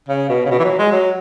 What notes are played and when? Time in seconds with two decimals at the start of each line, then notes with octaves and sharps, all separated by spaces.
0.09 C#3
0.29 B2
0.46 C#3
0.51 B2
0.59 E3
0.64 F#3
0.79 G#3
0.91 F#3